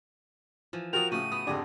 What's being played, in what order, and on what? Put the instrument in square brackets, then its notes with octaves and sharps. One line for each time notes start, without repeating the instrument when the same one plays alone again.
[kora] E3 F3
[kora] F3 F4 [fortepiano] F#4 A#4 [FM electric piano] G5 D#6 [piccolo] F7
[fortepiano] A2 C#3 [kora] F#4 [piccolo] D#7
[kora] B3 [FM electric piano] D#6
[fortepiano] G#1 F2 D3 [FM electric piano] G4 D5 [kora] G#4